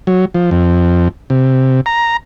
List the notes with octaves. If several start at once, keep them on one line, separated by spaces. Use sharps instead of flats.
F#3
F3
F2
C3
A#5